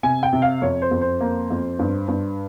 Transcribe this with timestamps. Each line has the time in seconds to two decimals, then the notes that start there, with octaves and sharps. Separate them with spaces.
0.03 C3 G#5
0.23 G5
0.33 C3
0.42 F5
0.62 F2 C#5
0.82 C5
0.91 F2
1.01 C5
1.21 A#3
1.50 F2
1.79 G2
2.08 G2